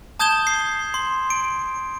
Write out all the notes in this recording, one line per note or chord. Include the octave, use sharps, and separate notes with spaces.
A5 D#6 G6 G#6 E7 G7
C7
C6
D7